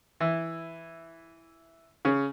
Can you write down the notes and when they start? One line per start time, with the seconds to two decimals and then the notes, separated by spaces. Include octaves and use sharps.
0.20 E3 E4
2.05 C#3 C#4